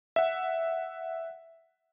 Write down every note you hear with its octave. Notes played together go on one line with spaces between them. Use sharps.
E5 F#5